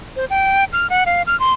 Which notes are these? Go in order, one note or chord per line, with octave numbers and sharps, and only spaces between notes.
C5
G5
F6
F#5
F5
F6
C6